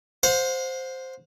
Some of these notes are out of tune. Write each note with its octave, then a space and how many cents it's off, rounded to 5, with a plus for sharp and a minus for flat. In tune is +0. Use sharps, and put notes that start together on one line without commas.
C5 +0 F#5 -45